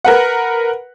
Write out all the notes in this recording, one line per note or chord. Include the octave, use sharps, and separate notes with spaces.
A#4 B4 F#5